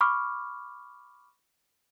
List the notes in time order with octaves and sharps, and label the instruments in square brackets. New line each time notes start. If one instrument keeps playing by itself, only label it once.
[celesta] B5 C#6 D6 F6